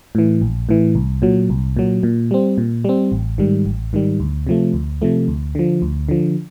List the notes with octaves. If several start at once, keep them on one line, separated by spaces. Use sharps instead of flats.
A2 E3
A#1
A2 E3
C2
A#2 F#3
C2
A#2 F#3
A#2
G3 C4
A#2
G3 C4
A1
G#2 D#3 G3
A1
G#2 D#3 G3
D2
C3 F3 A3
D2
C3 F3 A3
D2
D3 F3
D2
D3 F3